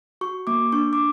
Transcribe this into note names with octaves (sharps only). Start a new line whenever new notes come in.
F#4 C#6
A#3 D6
D4 C#6
D6